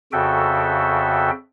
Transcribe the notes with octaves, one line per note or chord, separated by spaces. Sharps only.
F2 C#3 F#4 A4 E5 G5